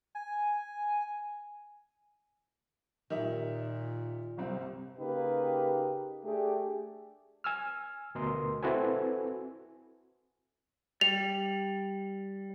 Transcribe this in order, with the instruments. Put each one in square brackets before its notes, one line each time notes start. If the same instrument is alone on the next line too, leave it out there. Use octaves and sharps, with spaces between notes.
[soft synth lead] G#5
[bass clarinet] A#2 [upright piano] D#3 G4 E5
[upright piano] G1 C2 C4
[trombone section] C#3 A#3 D#4 G4 B4
A3 D4 G4 G#4
[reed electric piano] G#5 E6 F6
D2 B2 A#4 D#5 C6
C4 E4 F#4 A4 B4 G#5
[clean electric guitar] G3 [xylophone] F7